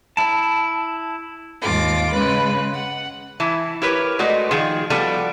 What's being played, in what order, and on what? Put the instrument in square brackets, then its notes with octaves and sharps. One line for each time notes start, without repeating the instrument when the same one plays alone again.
[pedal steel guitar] E4 A5
[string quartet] D#2 G#2 F4 D6
C#3 G#3 B4
F#5
[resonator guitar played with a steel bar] E3 E4 A5
E4 G4 A#4 B4 C#5
G#3 A3 F#4 B4 D5 D#5
D#3 F3 G#4
F3 G3 B3 F#4 A4 D5